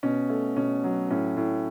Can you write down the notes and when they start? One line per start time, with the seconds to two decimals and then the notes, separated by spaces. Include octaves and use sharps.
0.03 B2 C#4
0.30 A3
0.56 B2 C#4
0.84 F#3
1.11 A2 C#4
1.37 A2